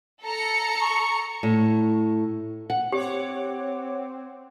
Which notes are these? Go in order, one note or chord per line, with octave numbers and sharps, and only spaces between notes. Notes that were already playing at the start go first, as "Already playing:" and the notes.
A4 A#5 C#7
C#6
A2
F#5
C4 G4 C#5 F#5 D6